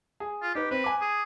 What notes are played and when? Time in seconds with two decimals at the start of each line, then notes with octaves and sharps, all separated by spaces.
0.20 G#4
0.43 F4
0.55 D#4 G4 B4
0.71 C4 B4
0.84 G#5 D6
1.01 G#4